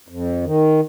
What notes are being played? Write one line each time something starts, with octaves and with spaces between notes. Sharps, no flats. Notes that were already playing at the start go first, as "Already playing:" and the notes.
F2
D#3